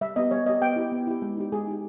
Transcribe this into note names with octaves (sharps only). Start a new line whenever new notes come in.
G3 E5
B3 G4 D#5
G3 C#5
B3 G4 D#5
B3 G5
E4 G4
B3
E4 G4
G#3
D#4 G4
G#3 G#4
D#4 G4